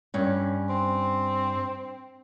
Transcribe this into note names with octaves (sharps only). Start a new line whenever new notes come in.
G2 C#4
C4